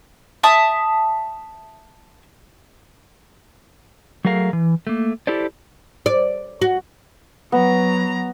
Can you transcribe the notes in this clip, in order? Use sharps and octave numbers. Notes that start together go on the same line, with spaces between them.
E5 A5 D#6
F#3 A3 G#4 A#4 F5
E3
A3 A#3
E4 G4 A4 C5 D5
D5
F#4
F#3 B3 A#5